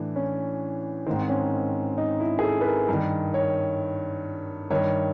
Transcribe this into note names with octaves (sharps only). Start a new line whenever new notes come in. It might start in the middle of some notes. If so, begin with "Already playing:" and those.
Already playing: A2 E3 D4
C#4
G#2 D#3 C4
C#4
D#4
E4
G#4
A4
B4
A#4
G2 D#3
C#5
G2 D#3 C#5